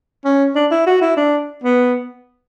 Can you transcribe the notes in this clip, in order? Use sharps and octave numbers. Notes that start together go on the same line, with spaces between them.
C#4
D4
E4
F#4
E4
D4
B3